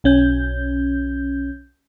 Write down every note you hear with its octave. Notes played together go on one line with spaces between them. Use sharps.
B1 C#4 G6